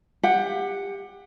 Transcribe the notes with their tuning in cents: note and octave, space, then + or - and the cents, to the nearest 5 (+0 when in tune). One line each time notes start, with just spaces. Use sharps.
G4 +25 F#5 +0